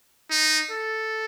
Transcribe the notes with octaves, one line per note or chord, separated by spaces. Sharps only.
D#4
A4